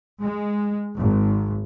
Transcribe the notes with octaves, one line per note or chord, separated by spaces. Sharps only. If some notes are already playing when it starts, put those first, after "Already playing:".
G#3
G#1